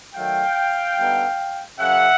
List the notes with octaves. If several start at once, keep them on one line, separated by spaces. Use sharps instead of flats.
D#3 F#3 A3 F5 G5
D3 G3 B3 D#4
F#2 C#3 F#3 E5 F#5